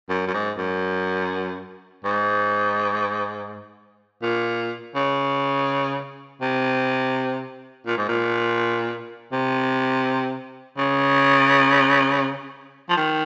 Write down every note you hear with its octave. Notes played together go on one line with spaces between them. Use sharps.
F#2
F#2
G#2
F#2
G#2
A#2
C#3
C3
A#2
G#2
A#2
C3
C#3
F3
D#3